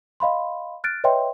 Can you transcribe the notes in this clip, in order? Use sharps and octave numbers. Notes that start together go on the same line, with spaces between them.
D#5 F5 B5 C6
F6 F#6 A6 D7
B4 C#5 D#5 E5 G5 C6